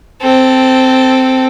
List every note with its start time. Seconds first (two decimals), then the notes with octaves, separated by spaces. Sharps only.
0.21 C4 A4